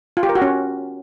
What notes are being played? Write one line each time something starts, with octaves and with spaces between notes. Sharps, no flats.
F4
G4
A#4
F#4
C#4